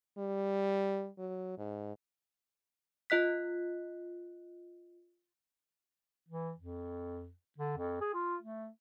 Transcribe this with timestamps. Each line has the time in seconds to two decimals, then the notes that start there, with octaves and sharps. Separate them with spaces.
0.18 G3
1.19 F#3
1.58 G#2
3.10 F4 D#5 F#6 B6
6.29 E3
6.58 F2
7.58 D3
7.78 F2
8.01 G#4
8.14 F4
8.42 A3